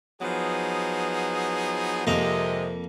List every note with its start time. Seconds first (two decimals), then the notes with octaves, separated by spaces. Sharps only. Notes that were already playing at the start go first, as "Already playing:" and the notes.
0.21 F3 F#3 B3 D#4 G#4
2.07 F2 C3 G#3 A#3 D#5 A#5